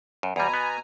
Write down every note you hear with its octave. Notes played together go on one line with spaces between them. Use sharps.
F#2
E2 B2 G3 G#5 A#5 B5
B3